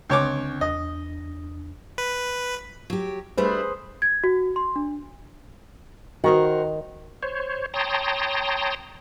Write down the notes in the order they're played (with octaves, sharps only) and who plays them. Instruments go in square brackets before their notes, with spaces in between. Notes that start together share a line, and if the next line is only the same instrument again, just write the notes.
[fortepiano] C#2 C#5 D6 [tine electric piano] D3 C4 D4
[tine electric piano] E2 D4 [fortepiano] D#5
[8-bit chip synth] B4
[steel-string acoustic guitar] F#3 G4
[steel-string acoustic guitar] G3 A3 D4 [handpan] G#4 B4 C5
[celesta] G#6
F#4
C6
D4
[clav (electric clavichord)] D#3 [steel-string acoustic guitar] F#4 A#4 C5
[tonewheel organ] C5 C#5
C#5 G5 A5 A#5 C6 D#6